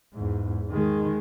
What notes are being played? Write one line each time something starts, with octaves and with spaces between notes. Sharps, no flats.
E2 G#2
D#3 G#3